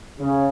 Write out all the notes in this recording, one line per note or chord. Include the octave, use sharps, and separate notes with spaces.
C#3